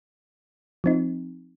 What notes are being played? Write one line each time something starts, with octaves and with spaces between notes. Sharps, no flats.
F3 C4 D#4